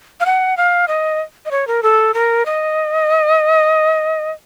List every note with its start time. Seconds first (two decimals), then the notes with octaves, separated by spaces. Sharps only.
0.20 F5
0.26 F#5
0.57 F5
0.88 D#5
1.45 D#5
1.51 C#5
1.67 A#4
1.83 A4
2.14 A#4
2.46 D#5